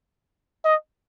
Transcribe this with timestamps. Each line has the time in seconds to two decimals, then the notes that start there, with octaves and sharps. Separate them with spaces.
0.65 D#5